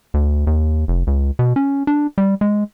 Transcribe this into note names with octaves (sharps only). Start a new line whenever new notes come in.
D2
D#2
F1
C#2
B2
C#4
D4
G3
G#3